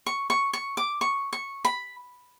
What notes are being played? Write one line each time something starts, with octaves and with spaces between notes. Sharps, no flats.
C#6
C#6
C#6
D6
C#6
C#6
B5